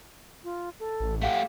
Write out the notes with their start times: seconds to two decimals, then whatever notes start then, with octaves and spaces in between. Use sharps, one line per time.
0.44 F4
0.80 A4
1.00 A1
1.22 A3 G4 F5 F#5